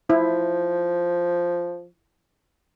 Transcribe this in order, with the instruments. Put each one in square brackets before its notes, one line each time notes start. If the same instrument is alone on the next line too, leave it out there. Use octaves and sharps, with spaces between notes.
[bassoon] F3 [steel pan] E4